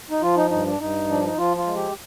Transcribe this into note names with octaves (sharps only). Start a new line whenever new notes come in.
D#4
F3 F4
D#4
G2 D#4
D4
G2 D#4
F3 D4
D#4
F3 F4
F4
G#3
G4